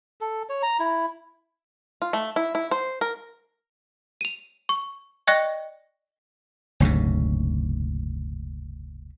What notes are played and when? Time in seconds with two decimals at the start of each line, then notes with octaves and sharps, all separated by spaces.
0.21 A4
0.49 C#5
0.63 A#5
0.79 E4
2.02 F4
2.13 A3
2.36 E4
2.55 E4
2.71 C5
3.01 A#4
4.21 D#7 F7
4.69 C#6
5.27 D5 D#5 G5 C#6 F#6 A#6
6.80 F#1 D2 G#2 C3